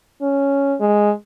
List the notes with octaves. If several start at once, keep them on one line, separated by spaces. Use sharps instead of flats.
C#4
G#3